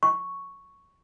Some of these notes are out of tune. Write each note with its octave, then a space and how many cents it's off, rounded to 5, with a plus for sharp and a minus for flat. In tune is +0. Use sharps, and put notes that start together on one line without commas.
C#6 +0